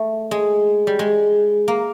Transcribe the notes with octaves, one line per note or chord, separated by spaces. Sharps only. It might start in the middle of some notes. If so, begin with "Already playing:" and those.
Already playing: A3
G#3
G3
G#3
A#3